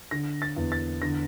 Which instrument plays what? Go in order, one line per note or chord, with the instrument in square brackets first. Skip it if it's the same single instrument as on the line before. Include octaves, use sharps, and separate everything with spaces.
[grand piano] D3 A#6
A6
E2
A6
D3 A#6